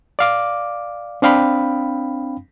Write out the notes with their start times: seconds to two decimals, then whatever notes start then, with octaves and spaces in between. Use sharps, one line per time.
0.19 D5 F5 D6
1.22 C4 D4 F5 G5 B5